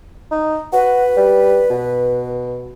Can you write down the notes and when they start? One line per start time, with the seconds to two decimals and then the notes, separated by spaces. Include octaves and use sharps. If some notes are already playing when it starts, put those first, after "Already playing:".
0.31 D#4
0.73 F#4 B4
1.17 G3
1.70 B2